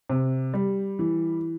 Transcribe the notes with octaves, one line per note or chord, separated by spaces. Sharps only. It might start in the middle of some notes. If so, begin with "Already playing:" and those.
C3
G3
E3